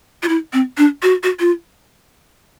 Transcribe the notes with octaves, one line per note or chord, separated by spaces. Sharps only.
F4
E4
C4
D4
F#4
F#4
F4